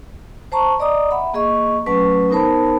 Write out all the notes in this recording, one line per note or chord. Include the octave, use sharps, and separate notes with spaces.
C5 A5 A#5 C#6
D5 D#5 A#5 D6 D#6
E5 F#5 B5
A#3 G#4 D#5 C#6
F#3 A3 C#4 B4 C#6
B3 D#4 A#4 C5 A5 B5